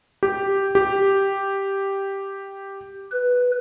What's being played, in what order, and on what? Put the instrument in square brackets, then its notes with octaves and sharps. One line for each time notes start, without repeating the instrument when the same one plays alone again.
[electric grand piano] G4
G4
[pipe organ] B4